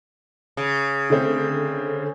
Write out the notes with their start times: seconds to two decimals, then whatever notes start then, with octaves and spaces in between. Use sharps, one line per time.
0.57 C#3
1.10 D3 A3 C4